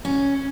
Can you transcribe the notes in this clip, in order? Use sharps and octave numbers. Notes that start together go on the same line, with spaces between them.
C#4